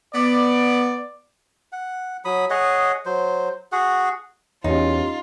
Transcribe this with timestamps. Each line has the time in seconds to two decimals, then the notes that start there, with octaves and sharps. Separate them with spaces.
0.14 B3 D5
1.72 F#5
2.25 F#3 B5 D#6
2.50 G#4 C#5 D#5 F#5
3.06 F#3 C5
3.72 F#4 G#4 F#5
4.64 E2 C#4 D#4 F4 G4